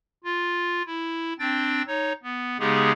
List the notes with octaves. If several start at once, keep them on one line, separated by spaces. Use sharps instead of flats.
F4
E4
C4 D4 G5 A6
D#4 C#5
B3
C#3 G#3 B3 D#4 G4 G#4